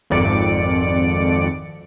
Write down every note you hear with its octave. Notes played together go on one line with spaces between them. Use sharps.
G#1 F2 D5 C#7 D7